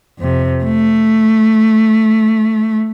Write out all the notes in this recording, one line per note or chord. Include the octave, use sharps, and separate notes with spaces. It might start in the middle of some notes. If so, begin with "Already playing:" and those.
F2 C3
A3